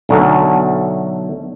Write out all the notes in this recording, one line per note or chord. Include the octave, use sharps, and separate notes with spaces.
B1 D3 F#3 A3